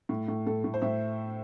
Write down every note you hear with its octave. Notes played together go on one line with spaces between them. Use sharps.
A2
A2
A2 A4
A2 A4
C5
A2 E5